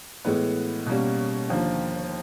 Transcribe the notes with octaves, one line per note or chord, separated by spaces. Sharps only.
A2 E3 G#3 B3
B2 G3 A#3 C#4
D#2 D3 F3 A#3